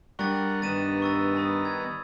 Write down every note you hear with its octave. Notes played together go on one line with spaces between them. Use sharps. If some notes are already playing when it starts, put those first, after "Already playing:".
G3 D4 G4 A#4 F#5 C#6 A6
G2 D#3 B3 A#5 A6 D#7 E7
C#6 E6 A6
A5 B5 D#6
G#6